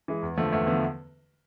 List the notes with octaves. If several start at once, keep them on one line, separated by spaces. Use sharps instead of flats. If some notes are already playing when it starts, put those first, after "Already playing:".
E3 G#3
E2
D3 F3 A3
E2 A3
D3 F3 B3